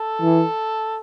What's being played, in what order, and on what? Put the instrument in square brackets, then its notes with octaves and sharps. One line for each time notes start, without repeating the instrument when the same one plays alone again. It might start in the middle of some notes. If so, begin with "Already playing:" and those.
Already playing: [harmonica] A4
[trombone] E3